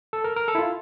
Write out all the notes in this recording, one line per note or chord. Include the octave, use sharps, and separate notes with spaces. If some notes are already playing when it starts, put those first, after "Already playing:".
A4
A#4
A#4
A4
E4
F4